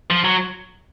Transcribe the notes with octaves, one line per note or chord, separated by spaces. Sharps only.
F3
F#3